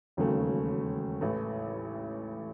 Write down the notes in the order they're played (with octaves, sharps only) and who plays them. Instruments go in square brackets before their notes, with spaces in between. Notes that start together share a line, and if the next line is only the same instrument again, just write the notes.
[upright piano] E1 D#2 C#3 F#3 A3
A1 A2 E3 A3